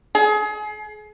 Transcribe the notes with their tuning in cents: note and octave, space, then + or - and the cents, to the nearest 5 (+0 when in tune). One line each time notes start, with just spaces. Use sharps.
G#4 +30